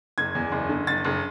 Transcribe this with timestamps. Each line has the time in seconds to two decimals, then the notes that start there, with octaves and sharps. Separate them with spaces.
0.18 F#1 G#6
0.35 E2
0.52 F#1
0.69 D3
0.87 F#1 A6
1.05 F#1